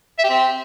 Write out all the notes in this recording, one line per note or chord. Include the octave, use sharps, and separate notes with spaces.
E5
G4
C4